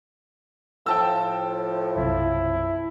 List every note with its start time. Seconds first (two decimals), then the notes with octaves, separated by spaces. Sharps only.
0.86 A2 F3 G5 A5 E6
1.96 B1 F#2 C3 E4